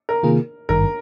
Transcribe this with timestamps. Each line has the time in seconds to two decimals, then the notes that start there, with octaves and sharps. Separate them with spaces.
0.09 A#4
0.23 C3 D#3 A#3 F4 G#4
0.69 G#1 G2 D#3 A#4